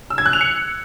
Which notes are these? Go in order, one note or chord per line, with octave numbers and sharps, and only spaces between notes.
E6
G#6
F#6
F7
C#7